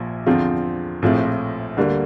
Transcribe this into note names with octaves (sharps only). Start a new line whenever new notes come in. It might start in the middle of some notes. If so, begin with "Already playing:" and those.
Already playing: A#1 A#2 F3
E2 D3 F3 C4 F4
A#1 A2 F3 C4 F4
D2 D3 G3 A#3